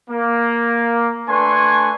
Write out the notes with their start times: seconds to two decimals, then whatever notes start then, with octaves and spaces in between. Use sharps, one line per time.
0.10 A#3
1.29 A3 D4 B4 G#5 C6 C#6